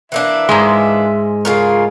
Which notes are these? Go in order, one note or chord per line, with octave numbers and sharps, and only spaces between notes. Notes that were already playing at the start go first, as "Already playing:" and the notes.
E3 A#3 D4 E5
G#2 G#3
C#3 F4 G#4 A#4